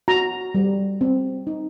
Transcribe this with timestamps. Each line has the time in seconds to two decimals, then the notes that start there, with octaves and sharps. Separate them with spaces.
0.08 F#4 A#5
0.55 G3
1.01 C4
1.47 D#4